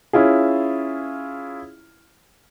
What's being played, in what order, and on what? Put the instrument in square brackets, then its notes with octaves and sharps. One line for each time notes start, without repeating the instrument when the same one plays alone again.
[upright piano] C#4 E4 F4 G#4